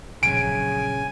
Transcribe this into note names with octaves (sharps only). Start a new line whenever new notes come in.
A#1 C#3 F#3 G#5 D7